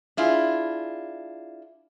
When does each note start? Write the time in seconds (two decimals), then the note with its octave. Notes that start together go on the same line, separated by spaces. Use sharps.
0.17 D4 E4 F4 G#4